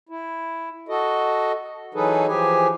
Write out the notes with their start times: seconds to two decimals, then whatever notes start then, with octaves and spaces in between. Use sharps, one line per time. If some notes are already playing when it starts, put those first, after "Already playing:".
0.09 E4
0.89 F#4 A4 D#5
1.94 E3 F#3 D#4 G#4 A4 B4
2.27 E3 F3 G4 G#4 G#5